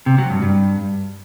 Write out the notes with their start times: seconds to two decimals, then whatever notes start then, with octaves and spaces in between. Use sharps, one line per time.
0.06 C3
0.18 F#3
0.30 G2
0.42 G2